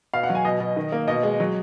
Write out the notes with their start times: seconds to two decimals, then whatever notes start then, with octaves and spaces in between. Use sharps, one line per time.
0.14 B2 F5
0.23 F#5
0.29 F#3
0.35 G#5
0.45 B2 D#5
0.60 B2
0.76 D#3
0.92 A#3
1.07 B2 D#5
1.23 G#3
1.40 F#3